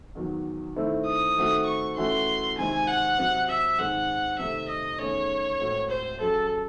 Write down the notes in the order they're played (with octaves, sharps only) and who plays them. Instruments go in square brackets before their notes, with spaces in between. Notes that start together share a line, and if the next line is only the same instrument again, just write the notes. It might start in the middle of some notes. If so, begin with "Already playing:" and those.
[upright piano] E2 D#3 F#3
D#3 A3 C4 E4
[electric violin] D#6
[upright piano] D#3 A3 C4 F#4
[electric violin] C#6
[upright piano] E3 A3 C#4 F#4 [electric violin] C6
[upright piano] C3 D#3 G#3 C4 [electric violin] G#5
[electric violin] F#5
[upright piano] C3 F#3 C4
[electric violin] E5
[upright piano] G#2 D#3 G#3 C4 [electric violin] F#5
[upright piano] C3 D#3 A3 C4 [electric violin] E5
[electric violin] D#5
[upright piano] E2 D#3 A3 C#4 G#4 [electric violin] C#5
[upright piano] A2 G#3 C4 F#4
[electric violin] C5
[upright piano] F#3 C#4 G#4 [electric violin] A4